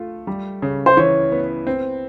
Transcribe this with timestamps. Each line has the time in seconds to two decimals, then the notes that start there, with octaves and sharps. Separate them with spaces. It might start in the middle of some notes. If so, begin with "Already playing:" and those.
Already playing: A3 F4
0.27 G3
0.62 C#3
0.86 C5
0.97 E3 C#5
1.32 B3
1.67 C4